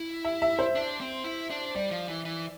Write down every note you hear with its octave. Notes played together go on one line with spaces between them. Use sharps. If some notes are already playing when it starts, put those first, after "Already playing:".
Already playing: E4
E5
E5
C5
D4
C4
E4
D4
G3 D5
F3
E3
E3